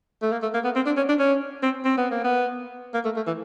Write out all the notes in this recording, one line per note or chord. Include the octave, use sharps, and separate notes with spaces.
A3
A#3
A3
A#3
B3
C4
D4
C#4
D4
C#4
C4
C4
B3
A#3
B3
A#3
A3
A3
E3